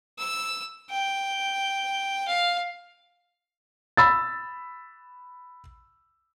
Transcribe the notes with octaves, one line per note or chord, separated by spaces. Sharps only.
E6
G5
F5
B5 E6 A6